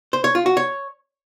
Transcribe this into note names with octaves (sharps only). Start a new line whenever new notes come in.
C5
C#5
F4
F#4
C#5